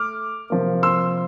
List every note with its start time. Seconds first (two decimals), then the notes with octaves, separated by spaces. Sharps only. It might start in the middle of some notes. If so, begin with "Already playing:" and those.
Already playing: A3 D6 F6
0.50 C3 F3 A#3
0.83 C6 E6